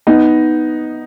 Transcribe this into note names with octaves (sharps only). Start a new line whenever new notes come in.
B3 D#4